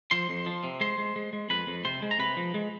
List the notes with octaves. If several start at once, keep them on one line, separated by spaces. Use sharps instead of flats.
F3 C5 C6
F2
F3
C3
G#3 C5 C6
G#3
G#3
G#3
F2 B4 B5
F2
C3 C5 C6
G#3
A#5
C3 B4 B5
F3
G#3